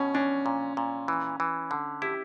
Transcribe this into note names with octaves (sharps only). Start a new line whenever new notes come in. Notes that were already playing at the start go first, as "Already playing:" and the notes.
Already playing: B2 C#4
C#4 D4
A#2
A#2
E3
E3
D3
E4 G4